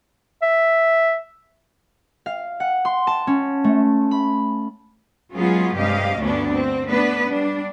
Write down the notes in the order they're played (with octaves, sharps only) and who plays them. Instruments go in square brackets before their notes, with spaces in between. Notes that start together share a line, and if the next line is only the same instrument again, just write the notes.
[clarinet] E5
[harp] F5
F#5
C6
A5
C#4
A3
B5
[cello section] F#3 G#3 B3 C#4 F4 G#4
G2 C3 G#3 G4 D#5 F5
D2 G2 A3 B3 C#4 D4
C4
A3 B3 D4 B4
G3 D4